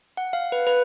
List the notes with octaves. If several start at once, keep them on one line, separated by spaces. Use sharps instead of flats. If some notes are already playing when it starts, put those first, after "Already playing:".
F#5
F5
B4
B4